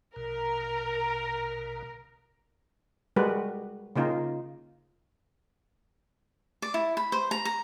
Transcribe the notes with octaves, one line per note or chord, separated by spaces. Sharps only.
A#1 B2 A#4
G3 G#3 F#4 A#4 B4
C#3 A#3 D#4 F4
D5
E4
B5
C5
A#5
A#5